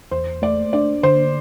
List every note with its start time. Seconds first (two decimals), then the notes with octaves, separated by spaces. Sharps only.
0.11 E2 C5
0.42 A3 D5
0.73 D4 D5
1.03 D3 C5